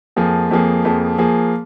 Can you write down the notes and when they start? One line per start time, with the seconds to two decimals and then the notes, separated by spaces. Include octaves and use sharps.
0.16 F2 F3 A#3 G#4
0.51 F2 F3 A#3 G#4
0.85 F2 F3 A#3 G#4
1.18 F3 A#3 G#4